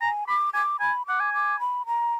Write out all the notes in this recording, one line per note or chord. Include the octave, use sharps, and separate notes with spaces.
G#5 A#5
B5 D6
G#5 D6
G#5 B5
F#5 D6
G#5
D6
B5
A#5